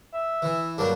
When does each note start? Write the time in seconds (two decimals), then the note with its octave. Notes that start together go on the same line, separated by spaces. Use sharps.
0.14 E5
0.42 E3
0.78 G2 F#3 A#3 D4